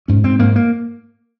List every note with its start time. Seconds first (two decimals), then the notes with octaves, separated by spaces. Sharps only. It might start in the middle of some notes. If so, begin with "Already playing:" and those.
0.08 G#2 C#4
0.24 G#2 C4
0.39 G#2 A#3
0.56 A#3